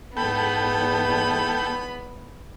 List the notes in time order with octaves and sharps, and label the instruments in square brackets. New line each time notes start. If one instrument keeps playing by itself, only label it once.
[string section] E2 G#2 [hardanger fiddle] B3 [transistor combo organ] A4 G5 [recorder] B5